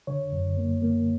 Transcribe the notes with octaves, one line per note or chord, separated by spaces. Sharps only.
D3 C#5
F#2
A#3
A#3